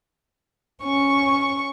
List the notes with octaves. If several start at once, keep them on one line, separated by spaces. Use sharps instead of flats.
C#4 C#6